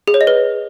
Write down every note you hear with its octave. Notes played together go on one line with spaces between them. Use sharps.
G#4
C#5
D#5
B4